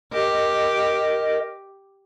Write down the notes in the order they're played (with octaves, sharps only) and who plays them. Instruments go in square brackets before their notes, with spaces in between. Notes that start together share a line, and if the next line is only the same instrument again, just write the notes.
[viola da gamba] G4 [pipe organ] A#4 D#5